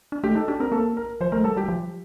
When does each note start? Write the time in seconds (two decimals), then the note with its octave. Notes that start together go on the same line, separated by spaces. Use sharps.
0.12 D4
0.24 A3 G4
0.35 D#4 A4
0.48 D4 G4
0.60 C4 A#4
0.72 A#3 A4
0.97 A#4
1.21 F3 C5
1.32 A3 A#4
1.44 G3 A4
1.57 G3 G4
1.68 F3